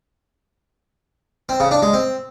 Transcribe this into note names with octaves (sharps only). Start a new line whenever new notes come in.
C4
C#3
D4
G#3
C4